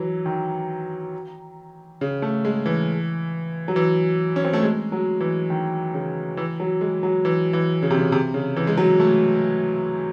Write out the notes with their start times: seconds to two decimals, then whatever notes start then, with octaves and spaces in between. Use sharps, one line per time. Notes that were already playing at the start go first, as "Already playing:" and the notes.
Already playing: E3 F#3
0.26 D#3
2.01 C#3
2.22 A3
2.45 G#3
2.66 E3
3.68 F#3
3.76 E3
4.36 C#4
4.45 C4
4.53 A3
4.63 G#3
4.92 F#3
5.21 E3
5.50 D#3
5.94 C#3
6.37 E3
6.60 F#3
6.81 G#3
7.03 F#3
7.25 E3
7.53 E3
7.83 C#3
7.91 C3
7.99 C#3
8.12 C3
8.34 C#3
8.56 E3
8.67 G#3
8.77 F#3
9.00 A3